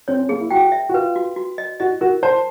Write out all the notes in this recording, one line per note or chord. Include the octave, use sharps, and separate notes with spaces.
C4 C#5
C#4
A#3 G#4
E4
F#4 G5
E5
F#4
F4 B4
F#4
F#4
D#5
F#4 D#5
F#4 A#4
C5 A5